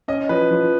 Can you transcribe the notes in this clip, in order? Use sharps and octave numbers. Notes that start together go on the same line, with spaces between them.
C#4 D#5
F3 B4
F3